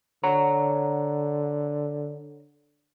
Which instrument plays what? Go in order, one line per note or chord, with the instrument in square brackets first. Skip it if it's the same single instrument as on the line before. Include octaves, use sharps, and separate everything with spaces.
[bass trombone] D3 [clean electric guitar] C#5 F#5 A#5